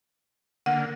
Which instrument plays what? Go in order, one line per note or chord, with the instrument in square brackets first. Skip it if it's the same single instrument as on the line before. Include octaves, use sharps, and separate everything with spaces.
[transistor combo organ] D3 A#3 [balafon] F#5